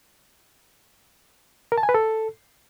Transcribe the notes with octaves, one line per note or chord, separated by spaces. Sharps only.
A#4
A5
G#5
B4
A4